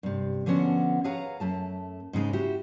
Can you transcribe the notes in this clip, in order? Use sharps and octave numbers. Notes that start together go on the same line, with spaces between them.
G2 C3
D3 F3 B3 C#4 F#4 F#5
G#4 B4 C#5 F5 F#5 A#5
F#2 A3 A5
G#2 C#3 G#3 D#4
E4 F#4 G4